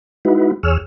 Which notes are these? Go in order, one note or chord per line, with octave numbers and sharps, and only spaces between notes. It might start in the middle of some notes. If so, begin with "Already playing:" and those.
G#3 D#4 E4 F#4 B4
E2 G#4 C#5 E6 F6